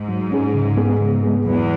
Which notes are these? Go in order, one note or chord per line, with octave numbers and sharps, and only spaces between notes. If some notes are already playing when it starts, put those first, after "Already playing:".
Already playing: G#2
F#3
C#4 G#4
C#3
G#3 B3 G#4
C#3
G#3 B3 G#4
E2 F#3